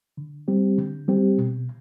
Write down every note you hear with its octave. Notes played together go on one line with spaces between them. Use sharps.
D3
G3 C4 G4
D3
G3 C4 G4
B2